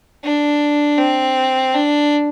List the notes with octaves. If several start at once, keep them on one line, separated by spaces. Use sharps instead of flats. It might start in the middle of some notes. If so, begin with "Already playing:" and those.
D4
C4
D4